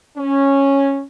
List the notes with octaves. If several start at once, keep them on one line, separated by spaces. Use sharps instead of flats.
C#4